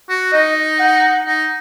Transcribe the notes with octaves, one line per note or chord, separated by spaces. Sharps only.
F#4
D#4 D#5
F#5
D#4